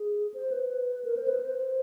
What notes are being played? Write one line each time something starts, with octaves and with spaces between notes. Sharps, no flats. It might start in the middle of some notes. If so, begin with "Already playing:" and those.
Already playing: G#4
C5
B4
A#4
C5
B4
C5